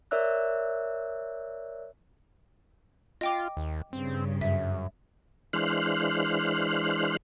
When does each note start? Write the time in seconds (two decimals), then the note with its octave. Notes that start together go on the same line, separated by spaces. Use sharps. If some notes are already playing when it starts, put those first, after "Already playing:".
0.11 A#4 C#5 D5 E5 E6 F#6
3.21 F4 D#5 G5 D6
3.57 D#2
3.93 G2 C#3 C4
4.41 F#2 E5
5.53 E3 G#3 D4 C5 F5 F#6